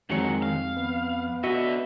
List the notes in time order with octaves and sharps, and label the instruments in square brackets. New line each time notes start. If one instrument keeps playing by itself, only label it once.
[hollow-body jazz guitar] F2 C#5 [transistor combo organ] D#3 G#3 [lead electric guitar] F#3
[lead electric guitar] F5
[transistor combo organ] B3
[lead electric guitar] D3 E5 [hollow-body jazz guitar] F#4 D#5